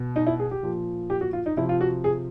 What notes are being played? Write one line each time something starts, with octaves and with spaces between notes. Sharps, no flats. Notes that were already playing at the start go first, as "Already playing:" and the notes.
Already playing: B2
D#4
E4
G#4
G4
A#2 F3
G4
F#4
F4
D#4
C3 F3 E4
F4
F#4
G#4